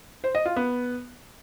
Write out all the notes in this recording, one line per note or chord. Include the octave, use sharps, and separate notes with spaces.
C5
D#5
F4
B3